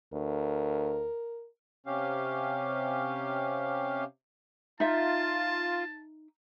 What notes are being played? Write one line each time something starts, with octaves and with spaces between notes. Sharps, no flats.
D2 A#4
C3 C#4 G4 F5
D#4 F4 E5 A5